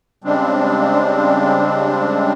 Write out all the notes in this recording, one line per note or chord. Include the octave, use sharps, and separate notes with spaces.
C#3 G3 G#3 C4 D4